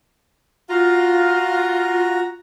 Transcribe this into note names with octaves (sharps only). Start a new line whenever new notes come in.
F4 F#4 A#5